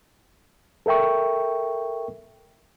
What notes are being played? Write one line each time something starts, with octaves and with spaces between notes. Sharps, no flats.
A4 A#4 E5 G5 C#6